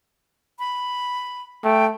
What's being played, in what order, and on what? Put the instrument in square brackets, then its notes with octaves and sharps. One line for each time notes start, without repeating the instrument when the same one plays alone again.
[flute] B5
[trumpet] A3 [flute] G5